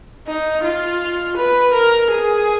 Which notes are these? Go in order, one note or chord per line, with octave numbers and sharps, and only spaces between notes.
D#4
F4
B4
A#4
G#4